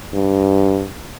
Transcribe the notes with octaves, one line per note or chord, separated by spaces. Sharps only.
G2